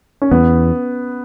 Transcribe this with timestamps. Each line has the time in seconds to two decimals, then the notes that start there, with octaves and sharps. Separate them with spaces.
0.22 C#4
0.31 E2 B3